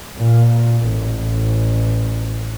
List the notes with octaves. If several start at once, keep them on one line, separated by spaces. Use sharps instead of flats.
A#2
A1